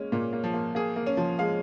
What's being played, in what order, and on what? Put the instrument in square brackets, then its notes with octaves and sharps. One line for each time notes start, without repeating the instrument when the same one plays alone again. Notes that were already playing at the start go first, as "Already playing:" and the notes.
Already playing: [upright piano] G#3 A#3 [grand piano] C#4
[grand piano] A#2 [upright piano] A#3
[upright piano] A#3
[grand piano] F3
[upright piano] A#3
[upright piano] A#3 [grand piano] G#4
[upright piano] A#3
[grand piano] C#4
[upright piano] F3
[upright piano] G#3 [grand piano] F5